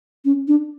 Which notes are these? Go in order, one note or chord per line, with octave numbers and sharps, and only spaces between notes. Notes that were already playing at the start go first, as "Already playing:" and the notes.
C#4
D4